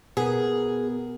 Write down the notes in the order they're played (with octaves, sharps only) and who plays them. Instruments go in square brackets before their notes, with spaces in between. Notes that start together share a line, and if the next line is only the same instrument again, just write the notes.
[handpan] B2 A#4 [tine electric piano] B3 [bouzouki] G#4